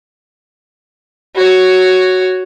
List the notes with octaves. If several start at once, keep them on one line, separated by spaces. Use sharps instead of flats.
F#4 C#5